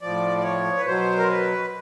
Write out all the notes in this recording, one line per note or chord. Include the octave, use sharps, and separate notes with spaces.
A2 F3 D5
D5
C#5
B4
B2 F#3 C5
A#4
B4